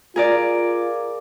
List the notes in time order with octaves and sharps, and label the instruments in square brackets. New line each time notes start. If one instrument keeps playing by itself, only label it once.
[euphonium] F4 [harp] G#4 A#4 D5